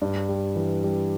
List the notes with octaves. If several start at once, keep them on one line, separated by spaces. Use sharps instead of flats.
G2
G3
E3
G3